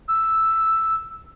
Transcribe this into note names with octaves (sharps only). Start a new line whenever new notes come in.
E6